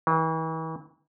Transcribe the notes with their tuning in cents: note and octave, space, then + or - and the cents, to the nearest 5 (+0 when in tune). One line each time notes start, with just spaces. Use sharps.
E3 -40